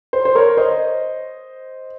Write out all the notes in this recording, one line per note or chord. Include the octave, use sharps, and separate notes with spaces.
C5
C5
A#4 C#5
C5 D#5